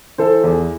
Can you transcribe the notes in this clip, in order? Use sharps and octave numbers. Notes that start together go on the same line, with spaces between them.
E3 A4 C5
E2